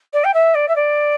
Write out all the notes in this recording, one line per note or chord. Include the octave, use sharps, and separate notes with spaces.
D5
G5
E5
D5
E5
D5